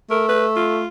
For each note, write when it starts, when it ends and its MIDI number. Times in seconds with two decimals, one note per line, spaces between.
0.10 0.86 57
0.10 0.27 70
0.29 0.46 71
0.56 0.87 65